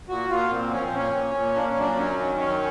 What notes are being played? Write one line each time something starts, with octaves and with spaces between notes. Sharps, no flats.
A#2 F#4
A#2 F4
A#2 C4
F3 C#4
C4
A#2 C#4
A#2
A#2
A#3 D4
C#4
F#2 D4
F#3 C#4
D#3
F#2 C#4